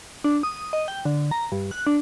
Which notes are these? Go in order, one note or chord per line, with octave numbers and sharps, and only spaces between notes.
D4
D#6
D#6
D#5
G5
D3
A#5
G2
F#6
D4